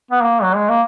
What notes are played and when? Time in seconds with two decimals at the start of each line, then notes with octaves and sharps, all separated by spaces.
0.11 B3
0.23 A#3
0.42 F#3
0.55 G#3
0.69 A#3